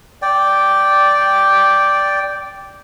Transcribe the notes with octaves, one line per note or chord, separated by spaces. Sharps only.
D5 G5